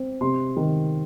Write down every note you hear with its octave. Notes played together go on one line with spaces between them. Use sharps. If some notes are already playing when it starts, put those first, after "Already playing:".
Already playing: C4
C3 C6
D#3